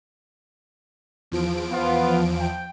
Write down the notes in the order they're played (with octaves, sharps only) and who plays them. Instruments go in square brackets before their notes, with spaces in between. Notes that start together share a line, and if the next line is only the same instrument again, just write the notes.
[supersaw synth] E2 F3 D7
[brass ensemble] B3 F4
G5